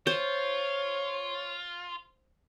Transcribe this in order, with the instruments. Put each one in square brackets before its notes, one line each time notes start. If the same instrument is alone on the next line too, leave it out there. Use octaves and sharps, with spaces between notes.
[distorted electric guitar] F4 [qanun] C5 [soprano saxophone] C#5